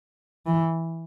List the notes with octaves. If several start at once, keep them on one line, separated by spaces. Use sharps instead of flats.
E3